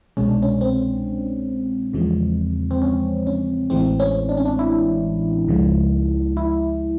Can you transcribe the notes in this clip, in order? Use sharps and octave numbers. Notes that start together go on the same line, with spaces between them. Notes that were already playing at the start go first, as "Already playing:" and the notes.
C2 B2 G#3 C#4
D4
C#4
C4
E2 C#3 F3 G#3
C4
C#4
C#4
A1 A2 E3 G#3 C4
C#4
D4
C#4
D4
E4
C#2 C#3 F3 G#3
E4